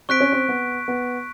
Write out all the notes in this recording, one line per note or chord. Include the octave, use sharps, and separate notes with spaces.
C4 C#6 F#6 B6 D7
C#4
C4
B3
B3